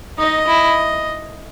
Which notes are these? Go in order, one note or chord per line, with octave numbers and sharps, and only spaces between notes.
D#4 D#5
E4